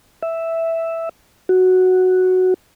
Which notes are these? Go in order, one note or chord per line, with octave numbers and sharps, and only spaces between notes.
E5
F#4